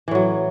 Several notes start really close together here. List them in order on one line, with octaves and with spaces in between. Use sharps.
E3 A2 F#3